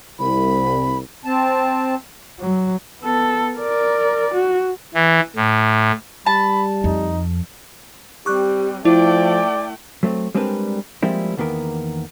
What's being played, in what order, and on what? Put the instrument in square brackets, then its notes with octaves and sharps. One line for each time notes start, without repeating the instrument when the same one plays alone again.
[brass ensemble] C2 [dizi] B5
[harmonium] C4 A5
[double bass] F#3
[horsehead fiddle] B3 A4
A#4 D5
F#4
[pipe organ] E3
A2
[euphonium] G3 [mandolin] A5 [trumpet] B5
[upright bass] F2 [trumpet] D#4
[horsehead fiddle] G3 C4 [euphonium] G4 [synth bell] C#6 D6 F#6
[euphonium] F3 [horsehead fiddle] A3 G5 [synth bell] E4 [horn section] D5
[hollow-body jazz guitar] F#3 A3 C4
G3 G#3 C4 D4 A#4 B4
F3 G3 G#3 A#3 C4 E4
E2 D#3 A#3 B3 A#4